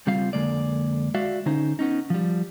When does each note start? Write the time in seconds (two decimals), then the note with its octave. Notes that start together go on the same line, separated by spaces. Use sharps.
0.07 C#2 G3 C4 F4 F5
0.33 F2 D3 G#3 A#3 D5
1.15 G#3 F#4 D5 E5 F5
1.46 D3 C#4 D#4 C5
1.79 B3 C#4 D#4
2.10 F3 G3